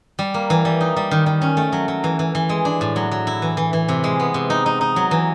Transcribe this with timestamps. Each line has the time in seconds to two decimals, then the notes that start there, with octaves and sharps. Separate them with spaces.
0.19 G3
0.34 A#3
0.50 E3
0.65 G3
0.81 D#4
0.96 G3
1.11 D#3
1.26 D#3
1.42 C#4
1.57 A3
1.72 F#3
1.88 F#3
2.04 E3
2.19 E3
2.35 E3
2.49 G#3
2.65 D4
2.81 A2
2.96 F#3
3.11 F#3
3.27 E4
3.42 E3
3.57 E3
3.73 E3
3.89 C3
4.04 G#3
4.20 B3
4.34 C3
4.50 D#4
4.66 D#4
4.81 D#4
4.96 F#3
5.11 E3